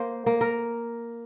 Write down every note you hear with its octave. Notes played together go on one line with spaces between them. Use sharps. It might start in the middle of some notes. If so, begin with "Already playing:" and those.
Already playing: A#3 C5
A#3
A#4